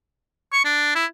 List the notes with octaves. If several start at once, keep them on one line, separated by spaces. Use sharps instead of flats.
C#6
D4
E4